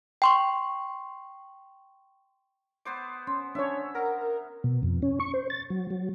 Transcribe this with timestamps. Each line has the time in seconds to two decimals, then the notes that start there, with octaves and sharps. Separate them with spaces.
0.22 G5 C6 C#6
2.85 B3 C5 D6
3.27 C#4 C6
3.55 C#4 D4 C#5 E5
3.95 A#4 F#5
4.64 B2
4.83 F2
5.02 C#4
5.20 C#6
5.34 C5
5.50 A6
5.70 F#3
5.90 F#3